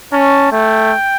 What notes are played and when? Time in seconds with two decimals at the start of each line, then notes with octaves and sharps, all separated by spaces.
0.13 C#4 A5
0.52 A3 G5